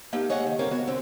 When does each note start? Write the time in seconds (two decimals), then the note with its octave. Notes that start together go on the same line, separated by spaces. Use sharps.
0.12 A3 A#3 D#4 G4
0.29 G#4 C#5 D#5 F5 F#5
0.47 D#3
0.59 G2 D3 C4 A#4 C#5 F5
0.71 B3 F#4 C#5
0.87 D3 C4